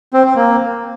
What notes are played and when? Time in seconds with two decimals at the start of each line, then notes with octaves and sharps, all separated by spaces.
0.13 C4
0.24 C4
0.35 A#3